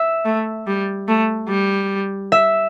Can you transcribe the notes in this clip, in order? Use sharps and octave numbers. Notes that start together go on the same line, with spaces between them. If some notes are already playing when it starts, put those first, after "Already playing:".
Already playing: E5
A3
G3
A3
G3
E5